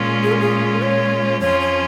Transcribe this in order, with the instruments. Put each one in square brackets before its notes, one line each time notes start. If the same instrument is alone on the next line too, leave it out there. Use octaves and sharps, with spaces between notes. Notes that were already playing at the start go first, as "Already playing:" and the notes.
Already playing: [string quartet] A#2 G#3 C#4 F4
[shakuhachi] G#4
A#4
G#4
A#4
C#5
[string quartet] F2 F3 C#4 F4 G#4 [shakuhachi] C#5
[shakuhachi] C#5